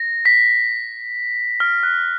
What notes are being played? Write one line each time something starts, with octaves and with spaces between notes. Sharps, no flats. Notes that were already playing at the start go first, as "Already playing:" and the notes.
Already playing: A#6
B6
F6
F#6